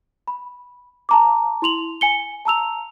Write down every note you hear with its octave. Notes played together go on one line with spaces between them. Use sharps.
B5
A5 A#5 D6
E4 C6 F7 F#7
G#5 C#7 G7
A5 A#5 E6 F7